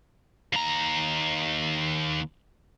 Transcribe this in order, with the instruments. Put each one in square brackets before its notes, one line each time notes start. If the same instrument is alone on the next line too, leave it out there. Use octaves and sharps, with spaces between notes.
[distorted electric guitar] D#2 A#5